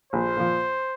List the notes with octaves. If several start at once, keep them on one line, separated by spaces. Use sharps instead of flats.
A#1 C5
A#2 F3